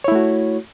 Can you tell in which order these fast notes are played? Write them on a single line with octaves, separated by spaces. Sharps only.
C#5 E4 A3 F#4